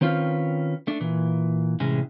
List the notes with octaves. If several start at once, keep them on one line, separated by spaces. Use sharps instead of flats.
D#3 C4 C#4 F4 B4
A3 D4
A#2 E3
A2 C3 E3 G#3 C#4